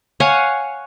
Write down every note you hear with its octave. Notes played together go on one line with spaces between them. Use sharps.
C#5 F5 F#5 G#5